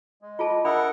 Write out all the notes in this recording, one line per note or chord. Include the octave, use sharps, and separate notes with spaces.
G#3
F4 G#4 D#5 A5
D4 A4 A#4 E5 F#5 B5 D#6